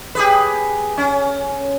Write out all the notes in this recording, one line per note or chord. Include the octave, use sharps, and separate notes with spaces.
G4 G#4 B4
C#4